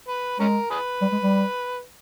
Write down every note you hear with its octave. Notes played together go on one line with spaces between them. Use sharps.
B4
G#3 C#4 A#4
G#4 B4
G3
G#3
G3